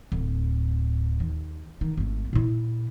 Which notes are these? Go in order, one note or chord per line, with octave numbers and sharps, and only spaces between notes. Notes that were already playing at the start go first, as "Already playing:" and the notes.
D1
D#2
D#3
G#1 A3
A#2 E4